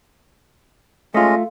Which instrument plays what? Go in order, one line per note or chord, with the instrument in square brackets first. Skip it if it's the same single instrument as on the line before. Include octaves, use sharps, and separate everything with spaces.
[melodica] G#3 C#4 D#5 [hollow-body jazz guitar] A3 F4